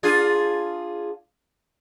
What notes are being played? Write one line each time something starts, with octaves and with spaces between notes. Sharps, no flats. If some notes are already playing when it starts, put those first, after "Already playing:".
D4 F4 G#4